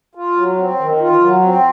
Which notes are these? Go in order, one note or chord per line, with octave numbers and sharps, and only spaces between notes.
F4
F#3
C4
D#3
F4
F#3
C4